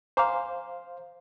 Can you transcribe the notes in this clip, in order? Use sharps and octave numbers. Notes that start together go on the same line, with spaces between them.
C5 F5 G#5 A#5 D6